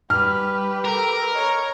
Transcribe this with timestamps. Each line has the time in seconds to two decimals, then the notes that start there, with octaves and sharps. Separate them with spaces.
0.10 G3 G4 B4 F6
0.85 A4 A#4
1.34 C#5 D#5 A#5